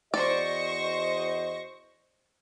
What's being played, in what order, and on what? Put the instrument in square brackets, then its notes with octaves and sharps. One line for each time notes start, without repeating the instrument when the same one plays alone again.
[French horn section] E2 F#4 D#5 [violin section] C5 C#6 A#6 [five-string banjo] D5